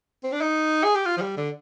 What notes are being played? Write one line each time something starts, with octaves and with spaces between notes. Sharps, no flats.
C4
D4
D#4
G#4
G4
F4
F3
G3
D3